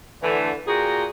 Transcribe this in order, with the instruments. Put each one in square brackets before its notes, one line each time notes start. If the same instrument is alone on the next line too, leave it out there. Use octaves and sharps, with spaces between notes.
[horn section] D3 E3 A3
A#2 F4 F#4 G#4 G5 A#5